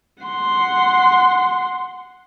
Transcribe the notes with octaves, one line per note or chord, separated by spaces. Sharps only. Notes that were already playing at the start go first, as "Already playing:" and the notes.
F#5 C6